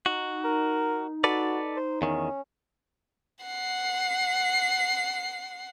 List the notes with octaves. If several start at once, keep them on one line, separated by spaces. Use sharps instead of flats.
D#4 F#4
A#4
F#4 A4 B4 D5
C5
E2 D#3 C#4
F#5 C7